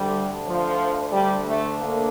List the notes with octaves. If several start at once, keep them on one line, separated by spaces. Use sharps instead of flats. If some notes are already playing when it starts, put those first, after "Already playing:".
Already playing: D2 D3 G3
F3
G3
A3
A#3